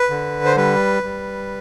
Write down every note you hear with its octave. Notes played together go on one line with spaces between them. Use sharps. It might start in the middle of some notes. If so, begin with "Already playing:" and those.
Already playing: B4
D3
C5
G3 B4
G3